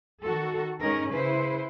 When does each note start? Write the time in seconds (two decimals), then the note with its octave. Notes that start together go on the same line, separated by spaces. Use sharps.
0.24 D#3 F#4 A4
0.80 G#2 C#4 D#4 A#4
1.11 C#3 E4 B4 C5